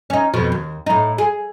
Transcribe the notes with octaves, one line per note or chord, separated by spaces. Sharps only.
C#4 D#4
F2 B2 F3
D#2
A2 D#4
G#4